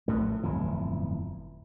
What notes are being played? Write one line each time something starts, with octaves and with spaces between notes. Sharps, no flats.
A#1 A2 A3
D1 G1 F2 E3